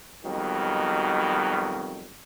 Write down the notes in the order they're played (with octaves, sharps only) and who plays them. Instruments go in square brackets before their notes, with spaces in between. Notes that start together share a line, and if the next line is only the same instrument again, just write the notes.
[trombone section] F2 B2 D#3 F#3 G3